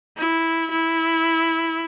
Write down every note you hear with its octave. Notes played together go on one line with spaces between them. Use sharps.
E4
E4